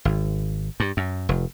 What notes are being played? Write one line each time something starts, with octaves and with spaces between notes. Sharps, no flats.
G#1
G2
F#2
F1